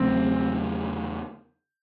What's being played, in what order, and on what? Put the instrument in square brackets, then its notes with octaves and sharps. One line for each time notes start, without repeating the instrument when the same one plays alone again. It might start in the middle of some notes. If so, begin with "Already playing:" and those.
Already playing: [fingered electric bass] E2 C#3 F#3 A3 [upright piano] C4